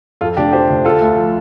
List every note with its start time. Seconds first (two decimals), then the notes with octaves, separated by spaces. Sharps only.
0.21 F2 F4 A4
0.37 F1 D4 G4
0.53 F3 G4 C5
0.70 F1
0.85 D3 F4 A4
1.01 D2
1.17 F3